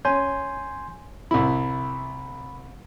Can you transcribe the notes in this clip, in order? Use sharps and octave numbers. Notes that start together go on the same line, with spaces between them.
C#4 G#5 C6 G6
C2 E4 B5